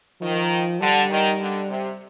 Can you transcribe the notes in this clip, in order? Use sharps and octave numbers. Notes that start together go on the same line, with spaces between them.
D#3 F3
D3 G3
D#3
D3
C3